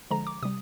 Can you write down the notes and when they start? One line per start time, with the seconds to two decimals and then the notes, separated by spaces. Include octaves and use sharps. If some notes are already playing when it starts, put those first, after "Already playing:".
0.11 D3 F3 G#3 A#5
0.27 D6
0.42 C3 G3 D#6